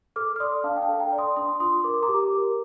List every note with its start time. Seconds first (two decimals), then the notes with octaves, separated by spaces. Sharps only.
0.16 A4 D6 F6
0.36 F6
0.40 D5 C6 D#6
0.64 D4 F5 A5
0.77 G5
0.82 F5 A5
0.88 A4
1.00 G5 A#5
1.13 D5
1.18 C6 D#6
1.36 D4 C6 D#6
1.60 F4 C6 D#6
1.84 A#4 D6
1.94 C6
2.03 A#5 D6
2.08 G4
2.33 A#4